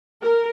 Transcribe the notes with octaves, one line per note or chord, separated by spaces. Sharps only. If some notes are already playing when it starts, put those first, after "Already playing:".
A#4